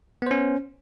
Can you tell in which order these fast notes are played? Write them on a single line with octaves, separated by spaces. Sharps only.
B3 C5 C#4